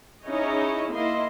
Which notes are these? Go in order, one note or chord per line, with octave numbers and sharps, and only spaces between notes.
C#4 D#4 E4 G#4 C#5 D#5
A#3 E4 D#5 C6